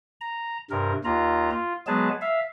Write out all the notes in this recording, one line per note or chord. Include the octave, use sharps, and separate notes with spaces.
A#5
G2 C3 A#4
D#2 F4 A#5
F4
F#3 G#3 B3 G#4 A5
E5 F5